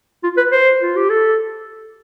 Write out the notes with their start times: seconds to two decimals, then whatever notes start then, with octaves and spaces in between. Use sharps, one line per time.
0.24 F4
0.37 B4
0.52 C5
0.82 F4
0.96 G4
1.10 A4